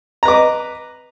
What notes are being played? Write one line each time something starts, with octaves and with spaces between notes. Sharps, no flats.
B4 D#5 A#5 D6